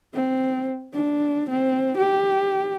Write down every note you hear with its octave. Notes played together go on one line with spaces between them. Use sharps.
C4
D4
C4
G4